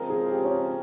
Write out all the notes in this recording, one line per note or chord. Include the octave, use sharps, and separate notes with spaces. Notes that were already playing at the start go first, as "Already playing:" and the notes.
Already playing: C#3 F3 G#3 C4 A#4
G#4
G4
C#4